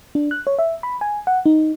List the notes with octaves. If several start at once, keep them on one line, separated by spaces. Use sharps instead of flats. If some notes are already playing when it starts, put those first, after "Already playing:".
D4
F#6
C#5
E5
B5
G#5
F#5
D#4